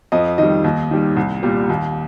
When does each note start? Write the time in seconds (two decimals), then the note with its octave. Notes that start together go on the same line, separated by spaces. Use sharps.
0.12 F2 D#5
0.38 D#3 G3 D#5
0.64 D#2
0.91 D#3 G3
1.17 C2
1.43 A#2 G3
1.69 D#2